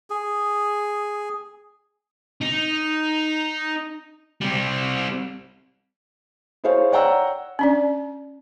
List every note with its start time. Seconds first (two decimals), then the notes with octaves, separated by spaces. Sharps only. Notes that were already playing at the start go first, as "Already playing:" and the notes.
0.10 G#4
2.41 D#4
4.41 G3 C4
6.64 E4 G#4 C5 C#5 F5
6.92 C#5 D5 F#5 G5 A#5 E6
7.59 C#4 D4 D5